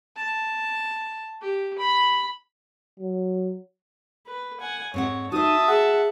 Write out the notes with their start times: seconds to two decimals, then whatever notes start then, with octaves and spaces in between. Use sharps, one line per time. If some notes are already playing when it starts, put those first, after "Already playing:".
0.17 A5
1.42 G4
1.78 B5
2.99 F#3
4.27 B4
4.60 F#5 G#5
4.94 G#2 C4 C#5 F#5
5.32 D#4 F#4 C5 E5 A5 D#6
5.68 G#4 F#5